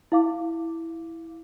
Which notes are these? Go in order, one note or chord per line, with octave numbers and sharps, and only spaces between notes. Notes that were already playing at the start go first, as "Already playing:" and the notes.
E4 F5 D6